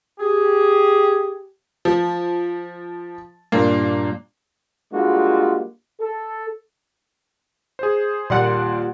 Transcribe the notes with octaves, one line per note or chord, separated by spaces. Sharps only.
G4 G#4
F3
G2 A#2 A#3 D4
G3 G#3 A#3 D4 F4 F#4
A4
G#4 C5
D#2 A#2 G3 D5 F#5 C6